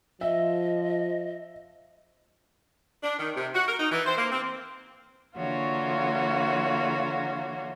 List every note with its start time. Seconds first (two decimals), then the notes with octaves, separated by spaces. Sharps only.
0.21 F3 D#5 E5
3.03 D4
3.19 D#3
3.36 C3
3.54 F#4
3.67 A#4
3.80 D#4
3.92 E3
4.05 C5
4.17 A#3
4.31 C4
5.37 D3 E3 A#3 F4 F#4 C#5